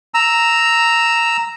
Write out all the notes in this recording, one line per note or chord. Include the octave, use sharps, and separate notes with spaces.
A#5 E6